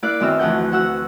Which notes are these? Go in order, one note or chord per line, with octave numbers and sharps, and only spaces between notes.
A#3 E4 D5 F5 F#6
F#2 D#3 B3 C4 E6 F6
D2 E3 F3 F#5 G6
F#4 F#5 E6